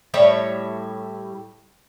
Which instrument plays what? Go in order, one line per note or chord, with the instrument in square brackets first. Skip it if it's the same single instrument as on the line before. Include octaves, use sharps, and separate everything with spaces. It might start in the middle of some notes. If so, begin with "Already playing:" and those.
[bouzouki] A2 G3 C#5 E5